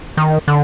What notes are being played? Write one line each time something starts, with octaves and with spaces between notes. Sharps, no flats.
D#3
D3